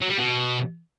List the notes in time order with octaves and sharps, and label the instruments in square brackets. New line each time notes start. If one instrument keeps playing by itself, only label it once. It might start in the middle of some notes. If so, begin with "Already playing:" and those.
[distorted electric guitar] F#3
G3
B2